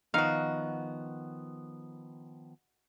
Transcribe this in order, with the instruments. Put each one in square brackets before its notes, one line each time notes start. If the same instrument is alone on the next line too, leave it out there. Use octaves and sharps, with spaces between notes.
[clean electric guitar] D#3 F3 B3 [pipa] D#4 F#4 [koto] F5